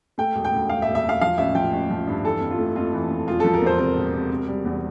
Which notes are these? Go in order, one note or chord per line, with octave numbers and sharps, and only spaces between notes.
A3 G5
E1
G5
D2
E1 F5
E5
E1
E5
E1 F5
F3 F5
A1 E5
F3 G5
A1
F3
G2
E3 A4
F2
F4
A3
F2 F4
E3
F2
E1 F4
A4
F3
A#4
E2 C5
C3 A#4
E1
C3
C3
G3
E2